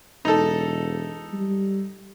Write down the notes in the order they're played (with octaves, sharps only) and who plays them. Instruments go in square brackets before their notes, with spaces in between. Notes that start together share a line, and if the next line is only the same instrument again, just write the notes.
[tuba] E1 [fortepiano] D#4 A4
[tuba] G3